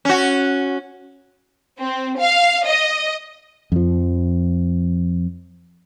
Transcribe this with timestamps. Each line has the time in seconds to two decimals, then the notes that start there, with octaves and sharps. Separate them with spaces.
0.05 C#4 F#4
1.80 C4
2.20 F5
2.68 D#5
3.72 F2 F3